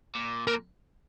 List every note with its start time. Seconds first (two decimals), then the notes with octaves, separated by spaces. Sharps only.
0.15 A#2
0.47 A#2 A#4